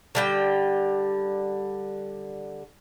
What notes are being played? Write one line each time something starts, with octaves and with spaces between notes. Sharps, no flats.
D3 G3 G5